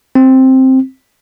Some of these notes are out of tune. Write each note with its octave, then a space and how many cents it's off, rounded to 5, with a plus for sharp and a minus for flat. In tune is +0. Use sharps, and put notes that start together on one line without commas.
C4 +5